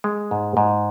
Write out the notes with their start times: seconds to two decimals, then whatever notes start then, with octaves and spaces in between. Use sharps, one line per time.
0.04 G#3
0.31 G#2
0.57 G#2